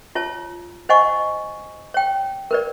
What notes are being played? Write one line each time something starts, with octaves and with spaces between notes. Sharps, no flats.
F4 C#5 A5
C5 D#5 F#5 G#5 C#6
C#5 G5
A#4 B4 D5